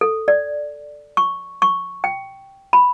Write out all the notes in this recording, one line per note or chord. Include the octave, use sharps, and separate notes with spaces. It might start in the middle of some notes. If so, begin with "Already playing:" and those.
A4
D5
C#6
C#6
G5
B5